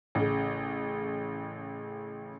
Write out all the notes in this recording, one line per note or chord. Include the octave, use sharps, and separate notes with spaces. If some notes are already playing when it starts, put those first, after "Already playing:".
A1 C#3